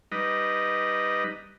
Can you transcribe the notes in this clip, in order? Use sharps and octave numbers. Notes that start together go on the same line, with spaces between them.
G3 D#4 B4 D#5